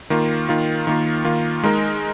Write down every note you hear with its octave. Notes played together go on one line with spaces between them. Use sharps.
D#3 A#3 F4
D#3 A#3 F4
D#3 A#3 F4
D#3 A#3 F4
G#3 D#4 A#4